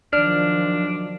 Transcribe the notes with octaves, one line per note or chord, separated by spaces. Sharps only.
D#3 F3 F#3 D4 D5 F6